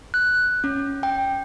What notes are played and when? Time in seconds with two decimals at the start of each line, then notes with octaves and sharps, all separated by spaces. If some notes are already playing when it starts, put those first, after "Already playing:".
0.14 F#6
0.64 C#4
1.03 G5